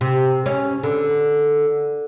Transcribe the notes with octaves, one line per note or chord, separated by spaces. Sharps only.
C3
C#4
D3